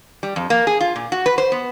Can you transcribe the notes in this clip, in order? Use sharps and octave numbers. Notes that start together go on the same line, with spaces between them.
G3
F2
A#3
G#4
F4
A#2
F#4
B4
C5
B3